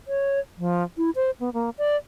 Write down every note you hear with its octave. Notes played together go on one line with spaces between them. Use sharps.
C#5
F3
E4
C5
B3
A#3
D5